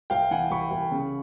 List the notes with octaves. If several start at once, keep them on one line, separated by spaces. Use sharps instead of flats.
C2 F5 G5
E3 F#5 G#5
C2 B5 C#6
C2
C#3